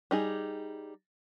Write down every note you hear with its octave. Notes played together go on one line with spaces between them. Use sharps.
G3 D#4 G#4